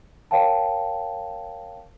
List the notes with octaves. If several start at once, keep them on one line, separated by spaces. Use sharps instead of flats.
A#4 C#5 F5 G5 A5